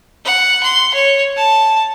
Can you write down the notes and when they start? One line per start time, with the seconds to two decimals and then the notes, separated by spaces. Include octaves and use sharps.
0.25 F#5
0.64 C6
0.94 C#5
1.36 A5